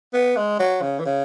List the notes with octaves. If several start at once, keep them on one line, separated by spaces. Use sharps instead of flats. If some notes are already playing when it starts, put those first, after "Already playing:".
B3
G#3
F#3
C#3
E3
C#3